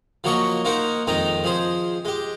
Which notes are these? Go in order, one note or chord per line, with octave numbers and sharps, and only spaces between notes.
F3 F#3 A#3 F#4 D#5 C#6
A#3 D#4 A#4 C5 F#5
F2 D#3 G#3 D#4 A#5
F3 G#4 C5
G#3 G4